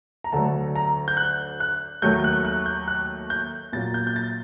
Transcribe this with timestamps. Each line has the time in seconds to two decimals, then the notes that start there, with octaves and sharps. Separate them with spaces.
0.24 A#5
0.32 D2 D3 F#3 A3 A5
0.76 A#5
1.08 G6
1.17 F#6
1.60 F#6
2.02 D#2 D#3 F#3 A3 G6
2.24 F#6
2.45 F#6
2.66 G6
2.88 F#6
3.30 G6
3.73 A#2 F#3 A#3 A6
3.94 G6
4.07 G6
4.16 A6